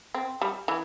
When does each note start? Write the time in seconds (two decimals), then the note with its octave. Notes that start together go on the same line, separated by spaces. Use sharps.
0.14 C4
0.41 G3
0.68 E3